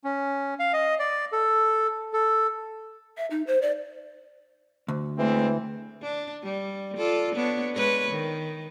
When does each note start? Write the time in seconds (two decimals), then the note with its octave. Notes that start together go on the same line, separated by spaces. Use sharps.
0.04 C#4
0.59 F5
0.73 D#5
0.99 D5
1.32 A4
2.13 A4
3.17 E5
3.31 D#4
3.47 C5
3.62 D5
4.88 D2
5.18 E2 E3 G#3 A3 C4
6.02 D4
6.43 G3
6.97 F4 A4 D5
7.35 B3 D4 C#5
7.75 G#3 B4 C#5
8.11 D#3